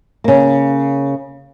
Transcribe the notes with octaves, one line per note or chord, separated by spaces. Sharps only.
C#3 A#3